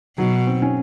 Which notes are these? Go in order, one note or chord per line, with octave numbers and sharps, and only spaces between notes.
B2 F#3
C4
C#4